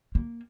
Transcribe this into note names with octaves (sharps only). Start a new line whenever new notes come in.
A#3